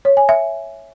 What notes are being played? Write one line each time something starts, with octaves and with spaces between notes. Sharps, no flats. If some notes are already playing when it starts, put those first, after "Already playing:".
C#5
G#5
E5